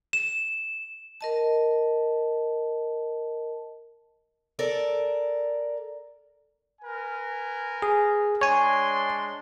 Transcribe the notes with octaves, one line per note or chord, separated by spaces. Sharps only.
E7
A#4 D#5 A5
A4 A#4 D5
A#4 B4 G#5
G#4
G#3 D4 C#5 G#5 C6